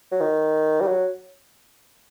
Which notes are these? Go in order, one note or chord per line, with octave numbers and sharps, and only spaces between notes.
F#3
D#3
G3
F#3